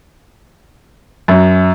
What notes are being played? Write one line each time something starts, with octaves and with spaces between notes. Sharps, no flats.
F#2